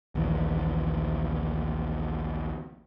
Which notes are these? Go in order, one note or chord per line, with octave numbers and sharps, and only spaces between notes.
A#1 D#2 E3